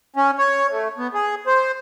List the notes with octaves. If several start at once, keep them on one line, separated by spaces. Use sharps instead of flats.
C#4
C#5
A3
B3
G#4
C5